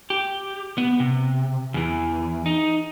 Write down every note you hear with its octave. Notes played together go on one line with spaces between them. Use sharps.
G4
B3
C3
E2 E3
D#4